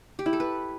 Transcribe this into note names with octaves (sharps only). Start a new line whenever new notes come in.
G4
E4
A4
B4